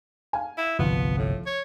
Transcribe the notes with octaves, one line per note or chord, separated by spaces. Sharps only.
F5 G#5
E4
G1 C2 G2 F3 B3
A2
C#5